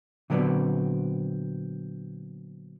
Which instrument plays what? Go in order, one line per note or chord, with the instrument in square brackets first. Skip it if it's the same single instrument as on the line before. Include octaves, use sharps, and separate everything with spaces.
[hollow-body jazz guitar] A#2 D3 F#3 B3 C4